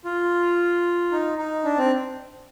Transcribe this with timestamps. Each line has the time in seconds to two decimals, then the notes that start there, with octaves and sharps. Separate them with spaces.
0.05 F4
1.12 D#4
1.38 D#4
1.64 D4
1.78 C4